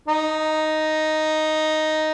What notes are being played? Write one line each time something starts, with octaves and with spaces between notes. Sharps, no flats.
D#4